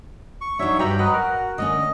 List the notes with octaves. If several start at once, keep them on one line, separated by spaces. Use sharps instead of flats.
C#6
F#3 D4 D#4 C#5 E5
G2 F#4 G4 B4 G5 A#5
F#3 B4 D#5 F#5
F#4 A#4
D3 A3 C#4 D#5